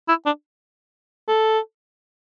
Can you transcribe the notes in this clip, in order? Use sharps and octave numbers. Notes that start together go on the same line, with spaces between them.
E4
D4
A4